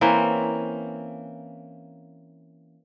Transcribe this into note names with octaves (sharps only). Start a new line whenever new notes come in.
E3 A#3 C4 C#4